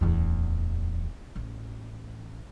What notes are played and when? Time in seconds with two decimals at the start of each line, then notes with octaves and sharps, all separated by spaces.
0.01 D1 E2
1.36 A1